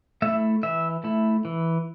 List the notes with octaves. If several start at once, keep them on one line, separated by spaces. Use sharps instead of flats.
A3 E4 E5
E3 E5
A3 E4
E3